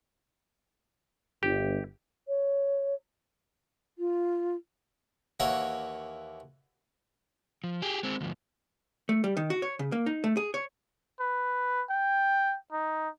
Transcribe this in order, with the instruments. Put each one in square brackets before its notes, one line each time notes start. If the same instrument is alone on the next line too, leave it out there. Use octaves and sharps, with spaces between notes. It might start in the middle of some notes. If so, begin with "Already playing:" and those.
[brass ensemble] G1 [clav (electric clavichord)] G4
[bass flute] C#5
[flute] F4
[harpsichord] D#2 E3 A#3 F#4 C#5 F#5
[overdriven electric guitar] F3
G4 G#4
G#3 C4
D2 F3
[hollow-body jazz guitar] A3
G3
D#3
F#4
C#5
C#3
A#3
D#4
A3
G#4
C#5
[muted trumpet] B4
G5
D#4